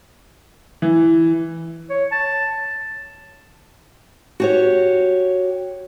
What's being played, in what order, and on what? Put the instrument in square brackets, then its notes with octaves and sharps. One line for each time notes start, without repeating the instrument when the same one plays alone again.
[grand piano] E3
[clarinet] C#5
A5
[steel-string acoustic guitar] F#4 G4 C#5